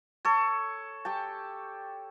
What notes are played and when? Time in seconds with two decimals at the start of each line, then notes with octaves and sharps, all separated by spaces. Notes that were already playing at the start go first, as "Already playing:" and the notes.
0.25 A4 C#5
1.05 G4 G5 A5